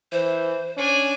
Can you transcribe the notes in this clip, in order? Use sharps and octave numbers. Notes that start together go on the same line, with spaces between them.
E3 C5
C#4 D4 G#5